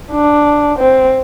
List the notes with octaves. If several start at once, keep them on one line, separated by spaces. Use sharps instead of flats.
D4
C4